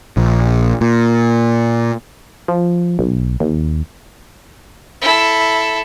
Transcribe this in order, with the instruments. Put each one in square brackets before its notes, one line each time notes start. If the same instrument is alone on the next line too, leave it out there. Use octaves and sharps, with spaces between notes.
[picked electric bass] A#1
A#2
[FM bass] F3
B1
D#2
[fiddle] E4 A4